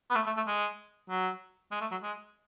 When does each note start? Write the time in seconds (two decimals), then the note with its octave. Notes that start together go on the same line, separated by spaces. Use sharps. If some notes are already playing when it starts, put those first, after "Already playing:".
0.11 B3
0.15 A3
0.26 A3
0.37 A3
0.47 G#3
1.10 F#3
1.72 G#3
1.81 A3
1.92 F#3
2.03 G#3